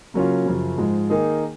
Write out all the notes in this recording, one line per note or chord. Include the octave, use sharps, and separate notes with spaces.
C#3 F#3 A#3 C#4 F4
F#2 C#3 F3
G#2 F3 G#3
D#3 A#3 D#4 G#4